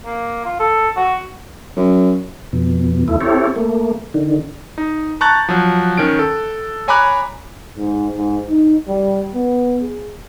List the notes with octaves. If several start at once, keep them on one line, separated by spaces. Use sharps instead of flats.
A#3
F4
A4
F#4
F#2
F2 B2
D#2 A3 E4
C4 E4 G4 A4 C#5
A3 A#3
D3 D#3
D#4
A5 A#5 C#6 F#6 G6 A6
F3 F#3
D#3 C#4 D7
A4
C#5 G#5 A#5 B5 D6 F#6
G#2
G#2
D#4
G3
B3
G#4